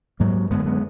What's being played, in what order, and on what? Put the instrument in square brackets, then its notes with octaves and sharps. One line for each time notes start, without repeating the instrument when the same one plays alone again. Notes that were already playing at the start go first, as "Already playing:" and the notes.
[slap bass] G#2 F#3 A#3
F#2 D3 G#3 B3
G#3 B3